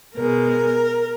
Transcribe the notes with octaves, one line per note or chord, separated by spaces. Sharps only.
B2 G#3 A#4